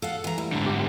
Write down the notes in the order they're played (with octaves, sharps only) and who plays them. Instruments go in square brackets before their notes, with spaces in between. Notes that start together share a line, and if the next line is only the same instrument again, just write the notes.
[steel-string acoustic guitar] A4 F5 F#5
E3 A#5
[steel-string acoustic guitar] G3 [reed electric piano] A3 E4
[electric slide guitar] G#2 D3
[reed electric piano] F#2 G4 F#5